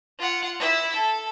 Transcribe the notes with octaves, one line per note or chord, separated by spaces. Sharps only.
F4 F#5
E4 E5
A4